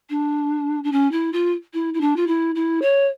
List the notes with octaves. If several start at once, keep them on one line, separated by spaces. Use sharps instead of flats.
D4
D4
C#4
E4
F4
E4
E4
D4
F4
E4
E4
C#5